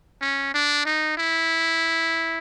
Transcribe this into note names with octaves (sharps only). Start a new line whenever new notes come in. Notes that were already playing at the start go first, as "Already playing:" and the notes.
C#4
D4
D#4
E4